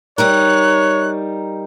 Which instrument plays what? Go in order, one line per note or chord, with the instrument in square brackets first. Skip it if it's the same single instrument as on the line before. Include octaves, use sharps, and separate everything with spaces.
[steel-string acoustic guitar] G3 D#4 A#4 [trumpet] C#5 [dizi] F#6